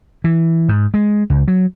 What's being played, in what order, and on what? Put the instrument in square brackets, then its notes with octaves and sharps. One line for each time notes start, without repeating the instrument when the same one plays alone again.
[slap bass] E3
G#2
G#3
C#2
F#3